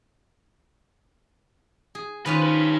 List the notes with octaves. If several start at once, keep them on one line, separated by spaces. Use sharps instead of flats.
G#4
D#3 C#4 F4 B4
G4 B4